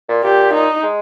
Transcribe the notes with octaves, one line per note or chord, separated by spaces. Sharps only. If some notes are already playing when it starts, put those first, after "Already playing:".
A#2
A#2 G4
D#4
G#3